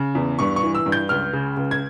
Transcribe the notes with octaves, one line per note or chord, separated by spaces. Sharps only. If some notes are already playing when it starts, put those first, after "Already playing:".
Already playing: C#3
E2
G2 C#6
C#6
E3
E6
G2
G6
C#2 F6
C#3
C#2
G#6